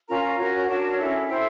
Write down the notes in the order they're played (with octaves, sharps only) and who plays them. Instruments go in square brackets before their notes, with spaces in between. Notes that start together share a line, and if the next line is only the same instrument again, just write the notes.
[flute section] C#4 F4 A#4 A#5
C#4 F#4 A#4 C#5
D4 F#4 A#4 C#5 A5
C#4 E4 A4
E4 A4 C5 G5